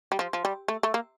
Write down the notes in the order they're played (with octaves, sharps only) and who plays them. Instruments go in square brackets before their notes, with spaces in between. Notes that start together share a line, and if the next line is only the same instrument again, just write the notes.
[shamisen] G3
F3
F3
G3
A3
A3
A#3